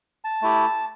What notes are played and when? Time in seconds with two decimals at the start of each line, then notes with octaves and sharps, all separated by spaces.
0.25 A5
0.42 A3 E4 G4